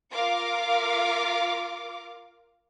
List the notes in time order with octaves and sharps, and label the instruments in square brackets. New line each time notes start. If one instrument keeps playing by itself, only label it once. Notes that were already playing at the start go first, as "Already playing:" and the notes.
[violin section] F4 A#4 F5 D6